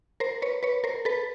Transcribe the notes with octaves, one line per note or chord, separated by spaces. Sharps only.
A#4 C5
B4 C#5
B4 C#5
A#4 C5
A4 B4